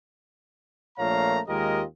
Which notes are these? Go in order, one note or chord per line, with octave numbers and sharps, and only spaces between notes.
A#1 A#2 A3 C#5 F5 A#5
D#2 G#3 F4 G4 A#4 D#5